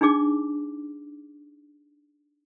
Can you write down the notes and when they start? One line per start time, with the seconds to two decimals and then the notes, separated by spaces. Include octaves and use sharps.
0.01 D4 D#4 G#4 D6